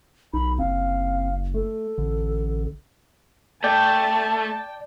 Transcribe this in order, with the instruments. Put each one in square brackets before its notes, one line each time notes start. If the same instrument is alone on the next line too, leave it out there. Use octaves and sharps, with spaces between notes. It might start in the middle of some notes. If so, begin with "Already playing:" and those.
[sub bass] B1 [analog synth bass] D#4 [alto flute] B5
[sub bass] F#1 [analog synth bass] C4 [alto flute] F5
[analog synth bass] A3 [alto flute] A4
[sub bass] A1 [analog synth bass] D3
[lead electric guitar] A3 [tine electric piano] D5 [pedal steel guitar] G5 [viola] A5